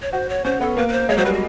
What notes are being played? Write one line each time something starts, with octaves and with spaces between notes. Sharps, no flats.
C#5
F#4 C5
C#5
C#4 C5
B3 A4
A#3 B4
B4
C5
G#3 C#5
F#3 C5
G3 B4
F#4